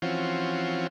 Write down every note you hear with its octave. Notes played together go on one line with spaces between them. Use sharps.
E3 F3 C4 C#4 F4 F#4